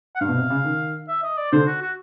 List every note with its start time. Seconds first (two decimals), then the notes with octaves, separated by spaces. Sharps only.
0.16 F#5
0.21 G2 F5
0.29 B2
0.36 C3
0.50 C#3
0.64 D#3
1.08 E5
1.23 D#5
1.38 D5
1.52 D3 C5
1.67 F#4
1.82 F#4